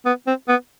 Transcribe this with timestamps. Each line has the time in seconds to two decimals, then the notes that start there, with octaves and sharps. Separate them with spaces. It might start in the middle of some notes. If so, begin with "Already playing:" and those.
0.06 B3
0.27 C4
0.48 B3